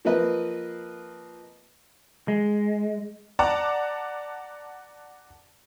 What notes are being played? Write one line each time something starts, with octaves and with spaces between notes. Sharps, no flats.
F3 A#3 C4 B4 D#5
G#3
D5 F#5 A5 A#5 D6